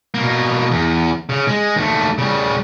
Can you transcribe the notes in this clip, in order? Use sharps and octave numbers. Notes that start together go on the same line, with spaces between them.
B2 A#3
E2
C#3
G#3
D#2 A3
C#3 G3